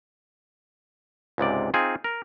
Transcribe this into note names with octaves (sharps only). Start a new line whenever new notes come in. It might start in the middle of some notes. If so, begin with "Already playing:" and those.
C#2 G#2 C3 D5
C4 D#4 F4 G#4
A#4